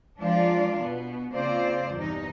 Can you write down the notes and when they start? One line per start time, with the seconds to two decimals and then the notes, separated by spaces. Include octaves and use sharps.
0.19 F3 G#3 D4 F4 A#4 D5
0.82 B2 B3
1.34 C#3 A#3 C4 F4 C5 D5
1.92 E2 G2 C3 D#4